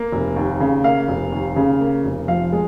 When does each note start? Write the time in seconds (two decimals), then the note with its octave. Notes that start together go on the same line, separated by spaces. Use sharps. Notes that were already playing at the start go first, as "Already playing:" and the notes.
Already playing: A#3
0.12 F1
0.36 D#2
0.60 C#3
0.84 A#3 F5
1.08 F1
1.32 D#2
1.56 C#3
1.80 A#3
2.04 F1
2.28 F3 F5
2.52 G#3